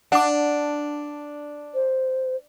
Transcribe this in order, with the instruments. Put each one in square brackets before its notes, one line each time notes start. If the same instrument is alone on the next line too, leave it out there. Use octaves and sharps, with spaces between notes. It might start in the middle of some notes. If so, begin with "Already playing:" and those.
[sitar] D4 [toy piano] F#5 D6
[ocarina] C5